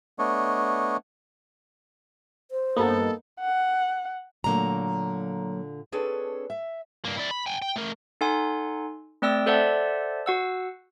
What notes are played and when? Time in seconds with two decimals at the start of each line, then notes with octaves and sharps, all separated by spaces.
0.19 A3 B3 D4 C#5 D#5
2.51 C5
2.76 G2 A#3 B3 D#4 A4
3.40 F#5
4.44 A#2 D3 F#3 A3 A#3 A#5
5.92 C4 D4 G#4 A4 B4 C#5
6.50 E5
7.05 G2 A#3
7.17 E4 D5
7.31 B5
7.46 G5 G#5
7.62 G5
7.76 A3 A#4
8.21 D#4 A4 F#5 G#5 C6
9.22 A3 C4 D5 G5 E6 A#6
9.46 A4 C5 D5 E5 F#5 A5
10.26 F#4 F#5 E6